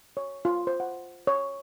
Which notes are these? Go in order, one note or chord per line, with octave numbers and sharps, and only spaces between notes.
C#5
F4
C5
F#5
C#5